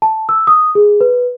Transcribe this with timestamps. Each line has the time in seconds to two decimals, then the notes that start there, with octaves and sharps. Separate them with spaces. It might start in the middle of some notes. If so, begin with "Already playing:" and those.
0.02 A5
0.29 E6
0.47 D#6
0.75 G#4
1.01 B4